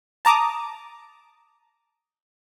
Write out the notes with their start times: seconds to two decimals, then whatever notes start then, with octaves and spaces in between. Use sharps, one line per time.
0.25 A5 A#5 D6 D#6